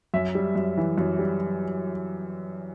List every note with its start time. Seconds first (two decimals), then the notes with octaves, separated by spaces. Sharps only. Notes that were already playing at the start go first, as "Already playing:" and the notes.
0.14 F#2 E5
0.35 G3
0.55 F#2
0.77 E3
0.98 F#2
1.19 G3